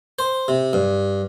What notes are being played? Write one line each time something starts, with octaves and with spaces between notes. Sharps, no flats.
C5
C3
G2